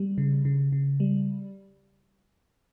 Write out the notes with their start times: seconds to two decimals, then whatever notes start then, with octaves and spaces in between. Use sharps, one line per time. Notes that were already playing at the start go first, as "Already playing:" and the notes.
Already playing: G3
0.18 C#3
0.45 C#3
0.72 C#3
1.00 G3